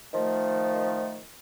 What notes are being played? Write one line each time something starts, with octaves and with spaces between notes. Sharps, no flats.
D#3 F3 A3